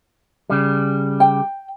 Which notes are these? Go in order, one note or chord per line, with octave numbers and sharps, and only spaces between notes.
C#3 G3
G5